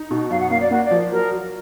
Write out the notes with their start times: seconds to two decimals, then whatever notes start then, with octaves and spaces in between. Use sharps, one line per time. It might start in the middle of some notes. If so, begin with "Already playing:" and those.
Already playing: D#4
0.10 B2
0.30 F#2 F5
0.40 F#5
0.50 A#3 F5
0.60 D5
0.71 A#3 F#4
0.84 D5
0.91 F3
1.11 F#3 A#4
1.31 F#3